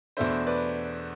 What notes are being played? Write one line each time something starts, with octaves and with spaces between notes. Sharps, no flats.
E2 B2 A3 D4 C5 E5
B4 D5